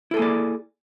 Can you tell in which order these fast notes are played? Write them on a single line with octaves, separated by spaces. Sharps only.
E4 A4 G#4 A#3 D5